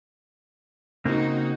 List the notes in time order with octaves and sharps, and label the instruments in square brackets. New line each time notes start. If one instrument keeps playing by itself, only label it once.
[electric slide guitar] C#3 A#3 C4 [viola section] D#4 F#4